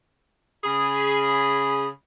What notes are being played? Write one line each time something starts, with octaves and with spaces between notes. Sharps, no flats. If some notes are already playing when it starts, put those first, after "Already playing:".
C#3 G#4 B5